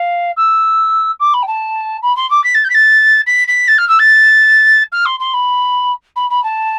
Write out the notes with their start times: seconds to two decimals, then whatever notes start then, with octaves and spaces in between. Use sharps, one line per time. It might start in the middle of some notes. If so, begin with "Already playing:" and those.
Already playing: F5
0.36 E6
1.19 D6
1.33 B5
1.42 G5
1.47 A5
2.02 B5
2.16 C6
2.30 D6
2.44 B6
2.54 A6
2.64 G6
2.69 B6
2.74 A6
3.26 B6
3.47 B6
3.68 A6
3.78 F6
3.88 E6
3.99 A6
4.92 F6
5.05 C6
5.19 C6
5.33 B5
6.16 B5
6.30 B5
6.43 A5